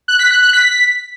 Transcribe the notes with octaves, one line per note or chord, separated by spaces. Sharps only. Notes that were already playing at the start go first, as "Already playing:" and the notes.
F#6
B6
F#6
F#6
B6